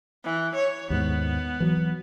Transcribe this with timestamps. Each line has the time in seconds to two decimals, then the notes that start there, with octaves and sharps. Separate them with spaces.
0.24 E3
0.55 C#5
0.90 D#2 G#2 B3
1.60 E3 F#3